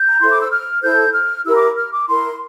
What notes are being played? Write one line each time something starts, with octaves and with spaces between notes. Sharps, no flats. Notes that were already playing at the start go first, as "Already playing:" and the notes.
Already playing: G6
A#5
E4 A4 C5 C6
D6
E6
F6
E4 A4 C5 G6
F6
E4 G4 A#4 E6
D6
F6
D6
E4 A#4 C6